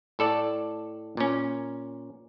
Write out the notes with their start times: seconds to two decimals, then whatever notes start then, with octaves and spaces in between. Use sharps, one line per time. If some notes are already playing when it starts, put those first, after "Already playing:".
0.19 A2 A4 D5 A5
1.17 A#2 C#4